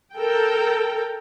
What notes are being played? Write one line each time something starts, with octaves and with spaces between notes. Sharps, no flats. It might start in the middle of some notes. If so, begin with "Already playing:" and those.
A4 A#4 G5